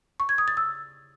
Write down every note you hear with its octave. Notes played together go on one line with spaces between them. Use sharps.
C#6
G#6
D#6
A6
E6